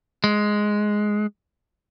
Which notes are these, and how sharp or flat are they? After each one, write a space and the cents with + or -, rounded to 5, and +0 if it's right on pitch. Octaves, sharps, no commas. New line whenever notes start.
G#3 +5